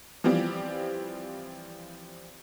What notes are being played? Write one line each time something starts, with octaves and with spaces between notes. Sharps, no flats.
E3 F3 G3 C4 G4